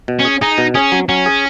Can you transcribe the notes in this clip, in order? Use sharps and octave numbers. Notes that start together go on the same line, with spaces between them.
B2
C#4
G#4
D#4 G#4
B2
C#4 G#4
F#3
F#3 C#4
G#4